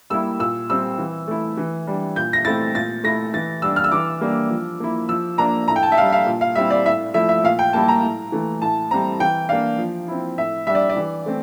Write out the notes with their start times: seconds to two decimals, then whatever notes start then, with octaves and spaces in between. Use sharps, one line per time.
0.10 G3 A#3 E4 E6
0.39 A#2 E6
0.69 G3 C4 E6
0.98 E3
1.28 A3 E4
1.57 E3
1.87 G3 D4
2.16 A#2 G6
2.33 A#6
2.45 A3 C4 E4 A6
2.75 A#2 A6
3.04 A3 E4 A#6
3.34 E3 A6
3.62 G3 D4 E6
3.76 F6
3.84 E6
3.92 E3 D6
4.21 G3 A#3 D4
4.50 F3
4.80 A#3 E4
5.09 F3 E6
5.38 A#3 D4 A#5
5.68 A2 A#5
5.76 G5
5.83 A5
5.92 E5
5.98 G3 D4 F5
6.13 F5
6.26 A#2
6.41 F5
6.55 G3 C4 E4 E5
6.70 D5
6.86 A2 E5
7.14 F3 A3 E4 E5
7.29 E5
7.43 A#2 F5
7.59 G5
7.73 G3 A#3 E4 A5
7.88 A#5
8.02 A2
8.32 E3 A3
8.61 A2 A5
8.91 G3 C4 A#5
9.20 E3 G5
9.49 A#3 D4 F5
9.78 F3
10.08 C4 E4
10.38 A2 E5
10.67 G3 D4 E5
10.75 D5
10.89 D5
10.96 E3
11.26 A3 C4